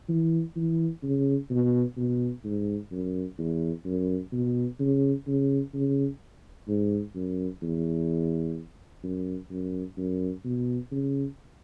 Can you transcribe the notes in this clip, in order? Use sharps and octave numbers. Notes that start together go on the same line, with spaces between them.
E3
E3
C#3
B2
B2
G#2
F#2
E2
F#2
B2
C#3
C#3
C#3
G#2
F#2
E2
F#2
F#2
F#2
B2
C#3